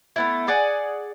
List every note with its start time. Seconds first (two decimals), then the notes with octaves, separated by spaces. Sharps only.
0.16 A3 B3 E4
0.48 G#4 D5 F#5 G#5